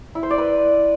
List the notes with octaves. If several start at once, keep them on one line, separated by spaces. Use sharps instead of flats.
E4
C5
D5
B4